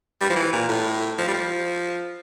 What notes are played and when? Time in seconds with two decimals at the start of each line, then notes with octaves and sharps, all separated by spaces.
0.21 G3
0.30 F3
0.36 E3
0.53 A#2
0.69 A2
1.18 F3
1.28 G3
1.34 F3